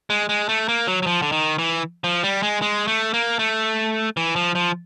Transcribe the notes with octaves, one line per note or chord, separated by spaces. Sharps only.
G#3
G#3
A3
A#3
F#3
F#3
F3
D3
D#3
E3
F3
G3
G#3
G#3
A3
A#3
A3
E3
F3
F3